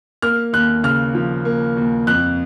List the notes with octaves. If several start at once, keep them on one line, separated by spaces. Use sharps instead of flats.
A#3 F6
D#2 F#6
C#3 F6
F3
A#3
D#2
F2 F#6